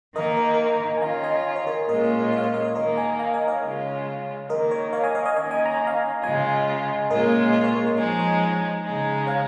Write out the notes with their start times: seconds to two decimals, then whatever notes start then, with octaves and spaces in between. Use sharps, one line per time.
0.15 D#3 A#3 D#4 A#4 D#5
0.37 A#4
0.54 A#4
0.97 G#5
1.02 D#3 C#4 F4 F5 A#5
1.23 D#5 G#5
1.56 C#5
1.67 A#4 D#5
1.89 A#2 G#3 C#4 F4 A#4 D#5
2.04 C#5
2.18 A#4
2.32 C#5
2.38 F5
2.43 A#4 D#5
2.54 A#4 D#5
2.64 C#5
2.75 D#3 A#3 D#4 A#4 D#5
2.97 D#5 G#5
3.19 F5 A#5
3.34 D#5 G#5
3.48 C#5 F5
3.63 C#3 G#3 C#4 F4
4.49 D#3 A#3 D#4 A#4 D#5
4.71 C#5
4.93 C#5 F5
5.03 D#5 G#5
5.15 C#5 F5
5.25 D#5 G#5
5.36 D#3 A#3 C#4 D#5 G#5
5.51 D#5 G#5
5.66 A#5
5.87 F5 A#5
6.23 C#3 G#3 F4 D#5 G#5
7.10 A#2 G#3 C#4 F4 A#4 D#5
7.53 A#4 D#5
7.64 C#5
7.75 A#4
7.86 C#5
7.97 F3 G#3 D#4 C#5
8.19 C#5
8.84 C#3 G#3 D#4
9.27 C#5 F5